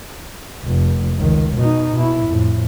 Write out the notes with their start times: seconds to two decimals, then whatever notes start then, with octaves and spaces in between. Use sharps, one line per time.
0.65 F1
1.18 C#2 D#3
1.57 B2 D#4
1.96 B2 E4
2.27 F2 A2